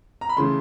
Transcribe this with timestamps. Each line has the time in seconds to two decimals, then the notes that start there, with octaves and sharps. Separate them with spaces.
0.21 A#5
0.29 B5
0.37 C#3 E3 A3 C6